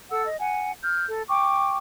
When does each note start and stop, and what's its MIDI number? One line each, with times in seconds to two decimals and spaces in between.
0.10 0.26 69
0.10 0.26 78
0.10 0.26 88
0.27 0.36 75
0.40 0.73 78
0.40 0.73 80
0.82 1.06 89
0.82 1.06 91
1.07 1.24 69
1.28 1.77 79
1.28 1.77 85
1.28 1.77 86